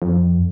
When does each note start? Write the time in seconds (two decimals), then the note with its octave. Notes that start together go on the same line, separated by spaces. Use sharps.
0.02 F2